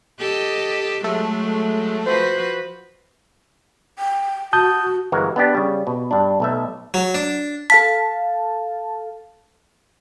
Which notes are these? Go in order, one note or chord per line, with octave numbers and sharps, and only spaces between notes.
G4 A4 D#5
F#3 G#3 A3
F3 F#4 B4 C5
G5
F#4 A5 D#6 G6
G1 E3 G#3 F#4 A#4
B3 D4 G4
C#3 G3
B2
G2 D4
B1 A3 E5
F#3
D4
A4 F5 A5 B6